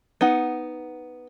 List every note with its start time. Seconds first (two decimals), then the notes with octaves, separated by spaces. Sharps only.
0.21 B3 D#4 F#5